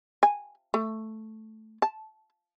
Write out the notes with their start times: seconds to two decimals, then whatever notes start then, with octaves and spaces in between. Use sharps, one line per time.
0.23 G#5
0.74 A3
1.82 A5